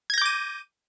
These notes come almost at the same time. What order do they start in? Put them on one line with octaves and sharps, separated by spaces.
G#6 A#6 G6 D6 D#7